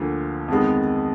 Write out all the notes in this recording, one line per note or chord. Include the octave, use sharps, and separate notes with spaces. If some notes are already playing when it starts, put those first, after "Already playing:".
Already playing: D2 D3 F3 A#3
F2 D#3 G#3 B3